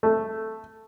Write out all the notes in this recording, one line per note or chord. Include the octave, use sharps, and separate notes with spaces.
A3